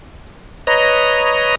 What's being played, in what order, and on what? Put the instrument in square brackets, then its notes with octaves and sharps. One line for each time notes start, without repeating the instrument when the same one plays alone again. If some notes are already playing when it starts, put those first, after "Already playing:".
[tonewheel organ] B4 C#5 D#5 A#5